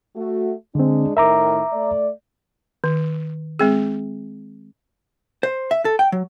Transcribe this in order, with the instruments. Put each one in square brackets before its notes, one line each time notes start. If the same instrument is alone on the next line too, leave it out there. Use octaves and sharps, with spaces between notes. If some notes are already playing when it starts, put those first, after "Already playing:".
[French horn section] A3 F#4
[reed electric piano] D3 C4 [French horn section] G#3 D4
[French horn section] A2 D#3 A#4 [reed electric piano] E5 A#5 D6
[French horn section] A3 D5
[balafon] D#3
G#3 C4 G#4
[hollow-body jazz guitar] C5
E5
A4
G5
F#3